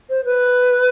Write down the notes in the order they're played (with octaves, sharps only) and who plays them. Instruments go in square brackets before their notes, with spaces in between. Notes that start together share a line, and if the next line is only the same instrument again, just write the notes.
[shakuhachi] C5
B4